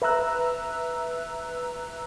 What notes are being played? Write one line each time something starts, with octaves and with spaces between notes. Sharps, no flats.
B4 E5 A#5 E6 F#6